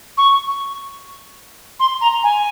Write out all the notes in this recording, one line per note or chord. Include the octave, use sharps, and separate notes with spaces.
C#6
C6
A#5
G#5